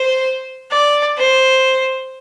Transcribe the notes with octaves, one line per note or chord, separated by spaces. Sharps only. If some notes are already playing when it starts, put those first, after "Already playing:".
Already playing: C5
D5
C5